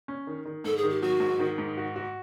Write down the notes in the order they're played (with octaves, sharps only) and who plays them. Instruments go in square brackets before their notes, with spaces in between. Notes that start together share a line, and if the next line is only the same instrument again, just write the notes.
[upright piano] C#4
D#3
D#3
[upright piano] G#2 [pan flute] A4
[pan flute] G#4
[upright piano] D#3
[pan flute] G4
[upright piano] F#3 [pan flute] F#4
[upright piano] G#2
D#3
G#2
F#4
F#4